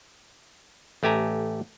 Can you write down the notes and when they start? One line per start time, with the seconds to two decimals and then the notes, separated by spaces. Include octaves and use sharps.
1.03 A1 A3 G4 G#5 A#5